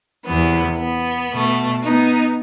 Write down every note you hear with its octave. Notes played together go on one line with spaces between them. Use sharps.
E2 C3 E3 B3
B3
B2 A3
B3 D#4